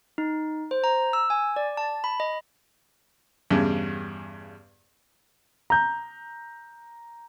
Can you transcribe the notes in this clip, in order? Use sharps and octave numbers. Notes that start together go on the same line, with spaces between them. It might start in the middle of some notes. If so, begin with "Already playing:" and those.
D#4
C5
A#5
E6
G#5
D5
A5
B5
D#5
E2 G2 C#3
A#5 G6